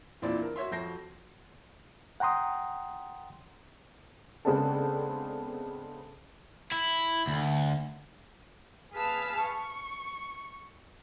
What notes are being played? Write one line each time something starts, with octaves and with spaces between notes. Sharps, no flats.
E2 A#2 C4 D4 E4 D5
A#4
F#4 C#5 E5 C6
F2 F#4 G6 A#6 C7
F#5 G5 A#5 C6 D#6
C#3 G#3 B3 C4 D4 A4
E4
D2
G#4 B4 F5 A5 E6
C#6